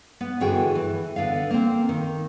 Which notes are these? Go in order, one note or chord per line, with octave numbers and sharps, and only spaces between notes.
B3
G2 D3 E3 F#4 G#4 G5
E3
D3 B3 F5
A#3 C4
D#3